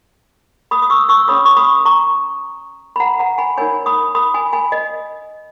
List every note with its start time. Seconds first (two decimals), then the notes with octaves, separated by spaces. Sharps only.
0.71 B5 D#6
0.82 D#6
0.90 C#6 E6
1.09 C#6 E6
1.28 C#4 G#4 C#5 B5 D#6
1.45 C#6
1.57 B5 D#6
1.85 A#5 C#6
2.96 B5
3.00 F#5 A#5
3.19 F#5 A#5
3.38 G#5 B5
3.57 D#4 A#4 C#5 G#5 B5
3.86 B5 D#6
4.15 B5 D#6
4.34 G#5 B5
4.53 G#5 B5
4.72 D#5